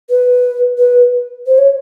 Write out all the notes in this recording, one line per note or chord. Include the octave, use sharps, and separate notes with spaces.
B4
B4
C5
C#5